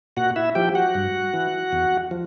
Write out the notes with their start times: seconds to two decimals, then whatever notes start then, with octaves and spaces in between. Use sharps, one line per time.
0.17 A#2 F#4 F#5
0.36 E4 E5
0.55 F3 G4 G5
0.75 F#4 F#5
0.94 G2
1.34 E3
1.72 E2
2.11 F3